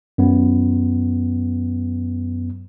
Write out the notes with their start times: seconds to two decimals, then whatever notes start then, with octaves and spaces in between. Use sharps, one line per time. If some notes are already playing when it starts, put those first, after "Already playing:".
0.18 F#2 B3